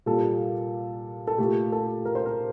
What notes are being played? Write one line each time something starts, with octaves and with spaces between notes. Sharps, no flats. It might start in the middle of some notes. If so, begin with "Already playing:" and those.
A#2 G3 A#3 A4
A4
A#2 A3 G4
A4
A#4
C5
A#4